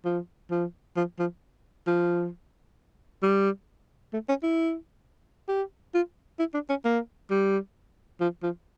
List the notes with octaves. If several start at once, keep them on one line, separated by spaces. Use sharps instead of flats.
F3
F3
F3
F3
F3
G3
A3
C#4
E4
G4
F4
E4
D4
C#4
A#3
G3
F3
F3